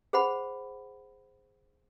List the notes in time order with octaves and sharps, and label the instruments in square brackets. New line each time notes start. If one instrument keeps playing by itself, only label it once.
[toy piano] G#4 C5 F#5 B5